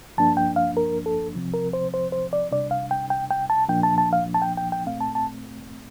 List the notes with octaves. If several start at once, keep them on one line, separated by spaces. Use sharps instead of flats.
G2 F3 A#3 D4 A5
G5
F5
A#4
A4
C3 F3 C4
A#4
C5
C5
C5
D5
C3 G3 D4 D5
F5
G5
G5
G5
A5
A#2 F3 A#3 D4 G5
A5
A5
F5
A5
G5
G5
G5
A#2 A3 C4 F5
A5
A5